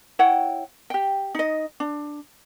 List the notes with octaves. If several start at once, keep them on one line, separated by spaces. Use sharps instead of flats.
E4 C#5 F#5 G5
G4 G5
D#4 D#5
D4